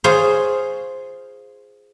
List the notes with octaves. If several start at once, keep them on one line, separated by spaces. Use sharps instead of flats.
F4 G#4 C5 C#5